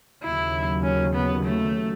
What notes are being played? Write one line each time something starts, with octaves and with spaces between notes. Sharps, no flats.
D#2 C#3 F#3 E4
C#4
B3
A3